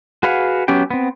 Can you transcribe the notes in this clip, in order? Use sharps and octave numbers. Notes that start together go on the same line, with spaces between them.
F#4 G#4 B4 F5 F#5
F#3 B3 C#4 G4 G5
B3 C4